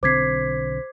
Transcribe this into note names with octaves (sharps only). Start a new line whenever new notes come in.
B1 D3 C4 C5 D6 G#6 B6 C7